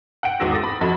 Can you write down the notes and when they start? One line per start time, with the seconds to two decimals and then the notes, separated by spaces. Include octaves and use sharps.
0.23 F#5 G5 D7
0.40 G#1 E2 F#4 E6 A#6
0.51 D6 D#6 A6 A#6
0.64 B5
0.81 F2 F#4 B5 A6